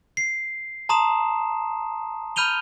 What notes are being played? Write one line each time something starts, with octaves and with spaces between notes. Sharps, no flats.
C7
A5 A#5 C6 D#6 E7
B5 F6 G6 D#7 F7 G7